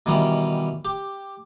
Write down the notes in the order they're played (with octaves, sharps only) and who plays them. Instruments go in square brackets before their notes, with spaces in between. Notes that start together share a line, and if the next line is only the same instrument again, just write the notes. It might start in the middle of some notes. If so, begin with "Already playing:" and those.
[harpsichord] B2 D#3 E3 G3 C#4
G4